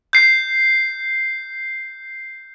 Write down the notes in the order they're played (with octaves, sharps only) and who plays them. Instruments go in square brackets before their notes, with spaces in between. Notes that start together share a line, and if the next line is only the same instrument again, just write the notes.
[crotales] G6 C7